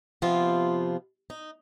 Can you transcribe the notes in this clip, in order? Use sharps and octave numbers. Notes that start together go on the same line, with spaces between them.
C3 F3 B3 F4
D#4